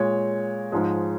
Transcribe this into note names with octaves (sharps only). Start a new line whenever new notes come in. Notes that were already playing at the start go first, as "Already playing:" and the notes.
Already playing: A#2 G#3 C#5
G#2 F3 G#3